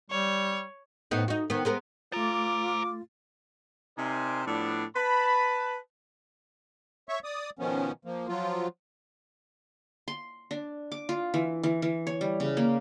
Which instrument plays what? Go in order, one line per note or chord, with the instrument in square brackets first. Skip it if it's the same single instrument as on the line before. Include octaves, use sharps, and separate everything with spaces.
[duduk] G3 [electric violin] C#5
[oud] A2 B3 D#4
D#4 F#4
D#3 B3
G#3 B3 A#4
[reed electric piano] A3 A6 [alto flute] F4 [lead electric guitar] C5 A#5 [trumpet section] D6
[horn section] C3 D#4 A#4 C5 D5 G#5
A2 F3 B3 D4
B4 A5 B5
[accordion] C#5 E5 C#6
D5 D#6
B2 D#3 F3 B3 C#4
F3 A#3
F3 F#3 F4
[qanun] C6
D4
D6
F4
E3
E3
E3
C#5
G3
C#3
A#3